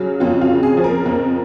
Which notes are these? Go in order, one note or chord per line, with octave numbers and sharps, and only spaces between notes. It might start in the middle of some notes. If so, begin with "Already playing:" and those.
Already playing: C#3 F#3
F2 F4
F4
C#3
G#4
F3
A#4
F2